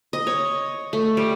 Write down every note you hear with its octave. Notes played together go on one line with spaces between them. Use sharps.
D#5
C#5
A3
G3